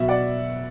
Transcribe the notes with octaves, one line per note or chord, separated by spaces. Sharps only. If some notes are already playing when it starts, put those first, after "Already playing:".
Already playing: B2 F#3 E5
D5 F#5